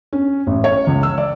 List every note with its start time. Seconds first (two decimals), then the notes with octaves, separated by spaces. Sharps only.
0.13 C#4
0.47 A1
0.64 C#5
0.87 C#2
1.03 E6
1.18 D5